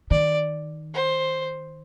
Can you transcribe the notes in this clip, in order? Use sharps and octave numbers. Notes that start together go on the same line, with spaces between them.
D#3 D5
C5